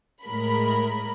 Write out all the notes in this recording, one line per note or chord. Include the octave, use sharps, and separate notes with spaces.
A2 G#3 A#4 B5